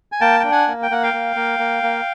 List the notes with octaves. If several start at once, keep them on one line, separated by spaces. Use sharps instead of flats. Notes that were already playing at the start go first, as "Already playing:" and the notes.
G#5
A#3 G5 A5
D4 G5
F#5 G#5
A#3
G5
A#3 F#5
F5 G5
A#3
A#3
A#3
A#3